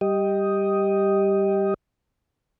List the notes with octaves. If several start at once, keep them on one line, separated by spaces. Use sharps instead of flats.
G3 G4 D#5